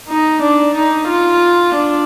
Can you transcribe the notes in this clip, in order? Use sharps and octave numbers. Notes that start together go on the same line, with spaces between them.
D#4
D4
D#4
F4
D4